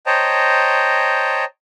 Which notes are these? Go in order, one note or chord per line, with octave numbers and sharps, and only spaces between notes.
C5 C#5 D#5 G5 A5 A#5